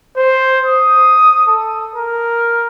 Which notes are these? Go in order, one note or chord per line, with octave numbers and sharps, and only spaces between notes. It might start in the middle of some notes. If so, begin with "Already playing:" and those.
C5
D#6
A4
A#4